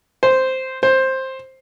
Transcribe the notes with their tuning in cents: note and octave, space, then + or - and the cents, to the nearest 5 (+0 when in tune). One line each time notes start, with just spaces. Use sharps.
C5 -5
C5 +10